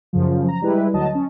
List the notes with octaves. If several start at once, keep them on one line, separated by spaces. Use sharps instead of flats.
F#2 C#3 F3
A#5
G3 G#3 E4 B4
D2 F#3 D#5 A5
C#4